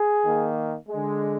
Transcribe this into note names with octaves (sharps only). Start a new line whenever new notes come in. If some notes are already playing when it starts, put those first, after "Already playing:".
Already playing: G#4
D#3 A#3
D3 G#3